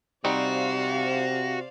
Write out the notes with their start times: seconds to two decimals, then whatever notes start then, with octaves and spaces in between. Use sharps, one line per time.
0.25 C3 G3 C4 D#4 F#4 C5 D5 F5